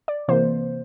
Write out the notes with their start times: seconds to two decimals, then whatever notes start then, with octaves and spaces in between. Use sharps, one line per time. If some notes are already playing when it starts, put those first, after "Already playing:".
0.08 D5
0.28 C3 E3 A#3 C5